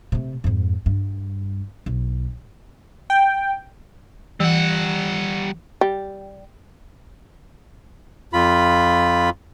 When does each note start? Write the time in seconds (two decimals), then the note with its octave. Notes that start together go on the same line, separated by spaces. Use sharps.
0.12 C3 A3
0.44 F2 G#2
0.86 G2
1.86 B1
3.10 G5
4.40 E3 G3 F#5
5.81 G3
8.33 F2 F4 B5